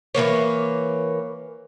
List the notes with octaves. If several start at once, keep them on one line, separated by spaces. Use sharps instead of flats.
E3 F3 A#3 C#5